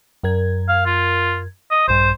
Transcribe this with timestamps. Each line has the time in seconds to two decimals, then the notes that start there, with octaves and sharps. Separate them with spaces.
0.23 F#2 A#4 G#6
0.68 F5
0.86 F4
1.71 D#5
1.88 A#1 G2 C5